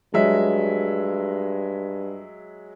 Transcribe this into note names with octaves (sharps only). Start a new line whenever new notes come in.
G2 F#3 G#3 E5